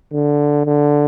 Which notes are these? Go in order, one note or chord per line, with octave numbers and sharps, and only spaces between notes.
D3
D3